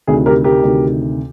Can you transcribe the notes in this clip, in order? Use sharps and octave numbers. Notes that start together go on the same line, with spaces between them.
D2 C3 D#3 G#4
G4 A#4
G4 A#4
D2 C3 D#3